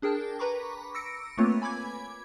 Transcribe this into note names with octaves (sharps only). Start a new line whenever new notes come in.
D4 G#4 A#4 G5 A5
B4 A#5 B5 C#6 D6
E6 A#6 C#7 D7
A3 A#3 C4 F4 B4 C#5
G#5 B5 D6 G#6